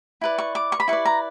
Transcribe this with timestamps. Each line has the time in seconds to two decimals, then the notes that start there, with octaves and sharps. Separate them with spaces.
0.21 E4 B4 D5
0.38 C#6
0.55 D6
0.72 C#6
0.80 B5
0.88 E4 B4 D5 C#6
1.05 A#5